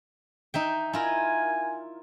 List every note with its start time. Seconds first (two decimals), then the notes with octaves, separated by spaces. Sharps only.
0.54 D#4 E5 G5
0.93 E4 F4 A#4 G#5